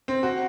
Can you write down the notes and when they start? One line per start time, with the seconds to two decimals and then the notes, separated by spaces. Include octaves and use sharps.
0.08 C4
0.23 F#4